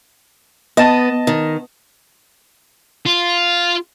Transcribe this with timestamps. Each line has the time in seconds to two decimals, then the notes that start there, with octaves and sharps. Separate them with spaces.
0.77 B3 D#5 A5
1.27 D#3
3.06 F4